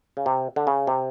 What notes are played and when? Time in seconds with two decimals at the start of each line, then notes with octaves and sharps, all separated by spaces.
0.17 C#3
0.26 C3
0.56 D3
0.67 C#3
0.87 C3